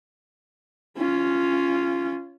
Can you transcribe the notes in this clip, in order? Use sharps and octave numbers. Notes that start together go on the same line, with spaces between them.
C#4 F4